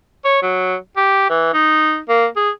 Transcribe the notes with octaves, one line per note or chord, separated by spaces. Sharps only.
C#5
F#3
G4
E3
D#4
A#3
G#4